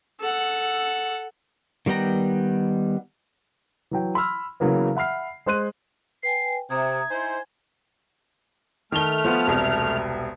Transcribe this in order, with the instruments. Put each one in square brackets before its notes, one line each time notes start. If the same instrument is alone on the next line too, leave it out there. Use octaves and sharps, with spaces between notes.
[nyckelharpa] A4 F#5
[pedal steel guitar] D#3 G3 B3 G5 A#5
[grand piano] E3 F#3 G5
B5 C6 E6 F6
C#3 E3 F#3 A#3 B3
E5 F#5 B5 F6 C7
G#3 C5 C6 F#6 D#7
[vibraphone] B4 G5 G#5 [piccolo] C7
[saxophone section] C3 [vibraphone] E5 A#5 D#6 [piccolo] G#6
[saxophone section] D#4 E4 C5 [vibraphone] G#5
[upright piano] D#3 G7 [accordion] A3 F6
[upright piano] F3 B3
E1 C2